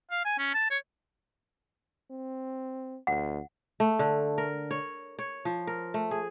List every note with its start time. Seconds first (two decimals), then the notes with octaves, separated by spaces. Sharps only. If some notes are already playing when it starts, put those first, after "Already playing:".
0.11 F5
0.25 G#5
0.39 C#4
0.54 A5
0.70 C#5
2.10 C4
3.07 D2 F#5
3.80 A3
3.99 D3
4.38 A#4
4.71 C#5
5.19 C#5
5.45 F3
5.67 A#4
5.94 A3
6.11 G#4